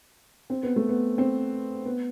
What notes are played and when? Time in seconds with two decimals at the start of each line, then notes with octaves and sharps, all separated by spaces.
0.50 C4
0.63 B3
0.76 A3
0.89 B3
1.18 C4
1.85 B3